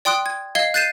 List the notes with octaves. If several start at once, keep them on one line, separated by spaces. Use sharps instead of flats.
D5 G5 C6 D#6 F#6 D7
G#6
D#5 F5 G#6 C7 G7
F#6 G6 A6 C7 D#7 E7